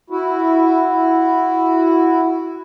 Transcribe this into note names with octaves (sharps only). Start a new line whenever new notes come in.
E4 F#4